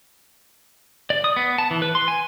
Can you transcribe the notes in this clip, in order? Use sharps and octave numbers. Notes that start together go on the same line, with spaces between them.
D5
D#6
B3
A5
E3
B4
C6
G#5